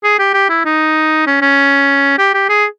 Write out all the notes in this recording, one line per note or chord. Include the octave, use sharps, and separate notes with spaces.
G#4
G4
G4
E4
D#4
C#4
C#4
G4
G4
G#4